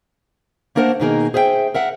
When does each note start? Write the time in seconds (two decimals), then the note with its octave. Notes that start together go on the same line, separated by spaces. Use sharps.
0.75 A3 A#3 D4 A#4 C5 F#5
1.00 B2 D#3 A#3 D#4 G#4 A#4
1.34 G#4 C5 E5 F5 G5
1.75 A#4 E5 F#5